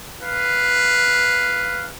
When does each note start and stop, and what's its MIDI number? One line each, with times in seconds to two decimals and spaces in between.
0.22 1.87 71
0.22 1.87 77